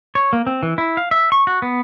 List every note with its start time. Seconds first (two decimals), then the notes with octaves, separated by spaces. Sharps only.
0.15 C#5
0.33 A#3
0.47 C4
0.63 E3
0.78 E4
0.97 F5
1.11 E5
1.32 C#6
1.47 F#4
1.62 B3